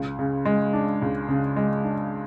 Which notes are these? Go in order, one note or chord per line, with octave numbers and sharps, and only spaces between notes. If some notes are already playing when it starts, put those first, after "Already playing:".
Already playing: C#2
C#3
G#3
D4
C#2
C#3
G#3
D4